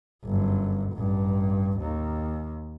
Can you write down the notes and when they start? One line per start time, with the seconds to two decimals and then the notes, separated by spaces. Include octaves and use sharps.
0.24 G1 F#2
0.93 A1 G2
1.79 D#2